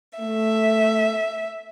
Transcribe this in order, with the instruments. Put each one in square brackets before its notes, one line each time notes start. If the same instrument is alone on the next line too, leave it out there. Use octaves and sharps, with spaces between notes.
[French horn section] A3 [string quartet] E5